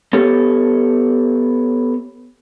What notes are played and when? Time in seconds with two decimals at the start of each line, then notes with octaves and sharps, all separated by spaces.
0.13 B3 G4 A4 C#5